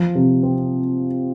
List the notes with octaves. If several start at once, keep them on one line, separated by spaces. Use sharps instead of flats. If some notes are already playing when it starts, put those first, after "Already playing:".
Already playing: F3
C3
C4